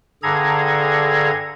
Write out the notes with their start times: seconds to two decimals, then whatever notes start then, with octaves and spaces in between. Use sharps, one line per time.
0.23 G2 D3 G#4 A4 A#5 G#6